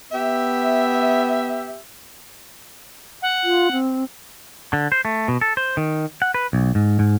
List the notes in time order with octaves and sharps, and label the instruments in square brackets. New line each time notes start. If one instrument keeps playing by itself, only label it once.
[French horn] B3 [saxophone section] G4 E5
[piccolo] F#5
[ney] F4
C4
[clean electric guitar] D3
C5
A3
B2
A4
C5
D#3
F#5
B4
B1
G#2
G#2